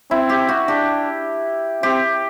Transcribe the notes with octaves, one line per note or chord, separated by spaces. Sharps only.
C4 E4
G4
F#4
D4 G4
C4 G4